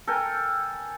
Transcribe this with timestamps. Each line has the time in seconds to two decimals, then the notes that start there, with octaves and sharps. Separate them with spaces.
0.07 A4 A#4 G5 G#5